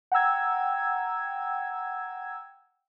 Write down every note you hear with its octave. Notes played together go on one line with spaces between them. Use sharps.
F#5 G5 A#5 E6 G#6